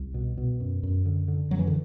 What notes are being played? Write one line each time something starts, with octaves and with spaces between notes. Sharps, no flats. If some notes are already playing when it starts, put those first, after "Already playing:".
Already playing: C2
B2
B2
F#2
F#2
D3
D3
F#2 F#3
E3
D3